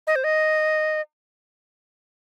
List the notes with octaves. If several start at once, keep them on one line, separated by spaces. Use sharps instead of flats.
D#5
C5
D#5